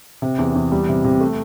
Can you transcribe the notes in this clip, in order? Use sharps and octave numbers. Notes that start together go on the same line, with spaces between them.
C3
E2
E2
G3
C3
C3
A3